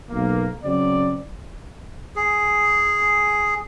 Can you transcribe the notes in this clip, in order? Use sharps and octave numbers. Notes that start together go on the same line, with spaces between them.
B1 A#3
C#3 F#3 C4 D5
G#4